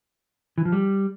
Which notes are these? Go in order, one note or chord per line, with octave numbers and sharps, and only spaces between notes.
E3
F3
G3